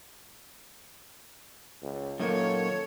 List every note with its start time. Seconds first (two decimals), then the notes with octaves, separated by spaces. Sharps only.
1.82 C#2
2.20 F#2 A#2 D#3 A#3 A4 C#5